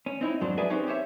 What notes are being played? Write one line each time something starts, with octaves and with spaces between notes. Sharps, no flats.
C#4
C4 D#4 E4
F2 G#2 F#3 D4 C5
G#4 B4 D5 E5 G#5 A5
C4 C#4 D#4 G4 B4 C5
G4 C5 C#5 E5